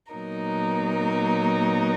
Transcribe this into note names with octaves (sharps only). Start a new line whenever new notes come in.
A#2 F#3 B3 D#4 A#4